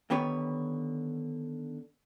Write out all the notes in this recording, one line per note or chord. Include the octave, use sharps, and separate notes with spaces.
D3 D#3 B3 G4 B4 C#5